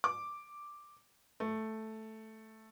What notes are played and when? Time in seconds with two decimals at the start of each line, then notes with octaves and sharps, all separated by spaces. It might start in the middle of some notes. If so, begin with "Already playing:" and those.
0.04 D6
1.40 A3